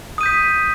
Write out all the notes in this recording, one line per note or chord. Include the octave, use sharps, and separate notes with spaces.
D#6 G6 B6 D#7